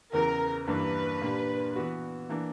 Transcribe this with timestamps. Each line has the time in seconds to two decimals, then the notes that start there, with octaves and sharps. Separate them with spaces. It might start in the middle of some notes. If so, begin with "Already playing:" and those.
0.13 E2 C#3 E3 A#4
0.67 G2 E3 A#3 D4 B4
1.21 A#2 A#3 D4 G4
1.76 E3 B3 F#4
2.29 E3 A#3 D4